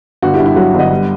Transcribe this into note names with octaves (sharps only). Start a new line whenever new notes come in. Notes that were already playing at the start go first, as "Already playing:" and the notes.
G1 F#4
E4 G4
G2
E4
F#3 F#4
G1
D#5 F#5
G3